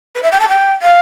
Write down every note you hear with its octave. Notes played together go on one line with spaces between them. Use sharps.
B4
E5
G5
A5
G5
F5